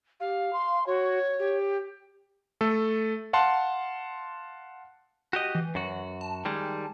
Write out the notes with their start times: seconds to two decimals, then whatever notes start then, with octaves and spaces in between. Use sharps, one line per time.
0.20 G4 F5
0.53 C6
0.87 F#4 C#5
1.39 G4
2.61 A3 A4
3.33 F5 F#5 A5 C6
5.33 F#4 G4 D#5
5.55 E3
5.75 F#2 F#4
6.21 A5
6.45 D#3 G3 G#3